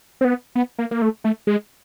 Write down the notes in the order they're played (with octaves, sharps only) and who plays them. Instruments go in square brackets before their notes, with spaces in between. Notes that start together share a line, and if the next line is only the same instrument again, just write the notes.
[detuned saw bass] C4
B3
B3
A#3
A#3
A3
A3
G#3